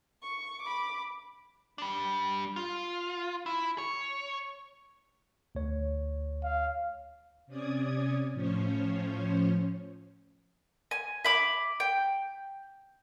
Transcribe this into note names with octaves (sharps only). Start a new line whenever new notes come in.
C#6
B5 D6
G3 D4
F4
E4
C#5
D2 C#5
F5
C3 C#4 D5 D#6 G#6
A2 F3 C#4 C5 C#5
G#5
E5 B5 D6
G5